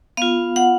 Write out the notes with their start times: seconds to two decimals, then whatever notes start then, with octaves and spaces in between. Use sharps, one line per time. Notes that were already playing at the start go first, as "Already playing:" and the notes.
0.17 B3 F4 F5
0.56 F#5